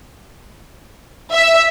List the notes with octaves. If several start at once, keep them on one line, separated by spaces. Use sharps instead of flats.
E5